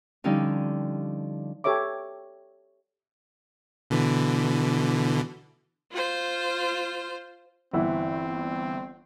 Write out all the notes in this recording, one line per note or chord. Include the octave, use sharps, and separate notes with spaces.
D3 F3 G3 C#4 D#4
G4 A4 C#5 E5 D6
B2 D3 E3
F4 C5
G1 E3 C4 E4 F#5